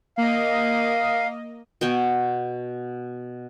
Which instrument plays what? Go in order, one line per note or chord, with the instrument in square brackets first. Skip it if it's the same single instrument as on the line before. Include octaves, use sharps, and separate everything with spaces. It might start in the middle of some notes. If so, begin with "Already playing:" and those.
[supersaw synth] A#3 D#5 [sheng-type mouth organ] F5
[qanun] B2 G5 G#5 C#6